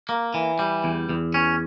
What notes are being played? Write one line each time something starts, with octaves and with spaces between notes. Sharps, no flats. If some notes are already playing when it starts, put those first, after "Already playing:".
A#3
E3
G3
E2
E2
C#4